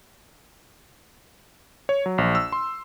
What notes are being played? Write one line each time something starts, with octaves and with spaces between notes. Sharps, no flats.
C#5
F#3
A#1
E6
C6